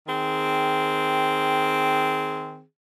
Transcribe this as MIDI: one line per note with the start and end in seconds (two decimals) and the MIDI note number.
0.07 2.61 51
0.07 2.61 60
0.07 2.61 68